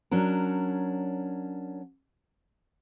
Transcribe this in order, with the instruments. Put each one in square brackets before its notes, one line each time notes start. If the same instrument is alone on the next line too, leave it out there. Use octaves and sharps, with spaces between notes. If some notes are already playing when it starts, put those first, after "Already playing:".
[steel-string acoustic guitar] F#3 C#4 D4 A#4